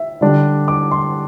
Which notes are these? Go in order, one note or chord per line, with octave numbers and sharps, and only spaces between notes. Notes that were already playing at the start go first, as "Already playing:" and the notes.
Already playing: E5
D3 G3 D4
D6
C6